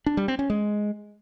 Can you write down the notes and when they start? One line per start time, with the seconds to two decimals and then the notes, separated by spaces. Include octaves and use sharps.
0.06 D4
0.17 G3
0.28 C4
0.39 C#4
0.50 G#3